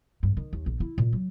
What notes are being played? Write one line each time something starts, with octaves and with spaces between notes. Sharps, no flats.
G2
D#3
D#2
A#1
E4
A#2
F#3